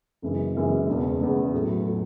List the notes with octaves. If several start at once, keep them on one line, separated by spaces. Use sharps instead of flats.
F#1 F#2 E3 G#3
F#1 F#2 E3 G#3
E1 E2 C#3
E1 E2 C#3
A2 F#3 A3
A2 F#3 A3